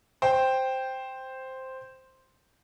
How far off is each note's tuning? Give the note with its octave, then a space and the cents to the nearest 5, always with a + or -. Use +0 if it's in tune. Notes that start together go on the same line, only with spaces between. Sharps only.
C5 +0 G5 +0